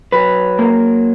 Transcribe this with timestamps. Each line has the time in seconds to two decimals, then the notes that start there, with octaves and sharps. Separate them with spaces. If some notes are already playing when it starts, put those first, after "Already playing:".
0.12 F#3 B4
0.59 A#3